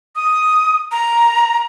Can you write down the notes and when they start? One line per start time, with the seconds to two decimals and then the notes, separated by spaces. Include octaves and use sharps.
0.16 D#6
0.92 A#5